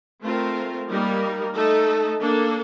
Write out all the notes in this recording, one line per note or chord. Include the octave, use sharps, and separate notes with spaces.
A3 C4 F4 A#4
G3 A#3 D#4 A#4
A3 D#4 A4
A#3 D4 A4